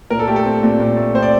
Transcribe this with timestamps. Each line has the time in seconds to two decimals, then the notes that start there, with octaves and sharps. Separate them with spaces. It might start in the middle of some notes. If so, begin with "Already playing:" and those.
0.10 A#2 A#4
0.19 A4
0.28 A3 G4
0.36 A4
0.45 C4
0.63 A#2
0.80 A#2
0.97 A3
1.15 C4 C5
1.22 D5